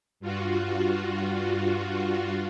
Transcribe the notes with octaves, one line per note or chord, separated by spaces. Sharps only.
G2 F4 F#4